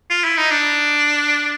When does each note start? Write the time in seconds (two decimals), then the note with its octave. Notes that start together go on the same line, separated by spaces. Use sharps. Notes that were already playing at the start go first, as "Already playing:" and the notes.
0.10 F4
0.24 E4
0.37 D#4
0.51 D4